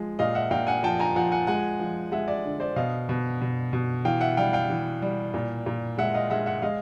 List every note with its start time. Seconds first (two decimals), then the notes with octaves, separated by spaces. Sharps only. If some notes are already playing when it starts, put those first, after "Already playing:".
Already playing: F3 G#3
0.19 A#2 D#5 F5
0.35 E5 F#5
0.51 A#2 F5 G5
0.67 F#5 G#5
0.83 F3 G5 A5
0.99 G#5 A#5
1.16 F3 F#5 G#5
1.32 F#5 G#5
1.47 G#3 F#5 G#5
1.79 F3
2.12 G#3 E5 F#5
2.28 D5 E5
2.44 D3
2.60 C5 D5
2.76 B2 D#5 F5
3.09 B2
3.41 B2
3.73 B2
4.05 E3 F5 G5
4.21 E5 F#5
4.37 G3 F5 G5
4.53 F5 G5
4.70 E3
5.02 G3
5.34 A#2
5.66 A#2
5.98 G#3 E5 F#5
6.14 D#5 F5
6.30 G#3 E5 F#5
6.46 E5 F#5
6.62 G#3 D#5 F5